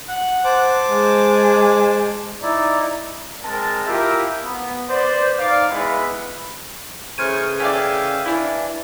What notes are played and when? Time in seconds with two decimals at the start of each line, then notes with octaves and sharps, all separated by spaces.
0.09 F#5
0.44 C5 A5 D6
0.89 G#3
2.42 D#4 E4 D5
3.43 G#3 C4 A#4 A5
3.86 E4 F4 G4 A#4 E5 F5
4.44 B3
4.89 B4 C5 D5
5.38 D#4 D5 F5
5.70 G#3 B3 E4 B4
7.18 C#3 E3 A3 C5 C#6 F6 G#6 D#7
7.60 C#4 D5 E5 F5 G5
8.26 E3 D4 E4